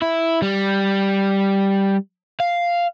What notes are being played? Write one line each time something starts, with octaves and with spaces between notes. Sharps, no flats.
E4
G3
F5